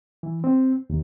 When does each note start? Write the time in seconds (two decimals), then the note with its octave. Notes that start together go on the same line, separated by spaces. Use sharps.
0.23 E3
0.44 C4
0.90 D#2